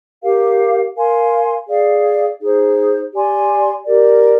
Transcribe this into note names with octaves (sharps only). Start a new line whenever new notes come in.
G4 A#4 F5
A#4 F5 G#5 C6
G#4 D5 F5
D#4 G#4 C5
G4 D5 G#5 C6
G4 A#4 D5